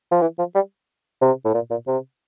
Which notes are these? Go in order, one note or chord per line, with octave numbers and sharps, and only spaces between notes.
F3
E3
F3
G3
C3
A2
A#2
A#2
C3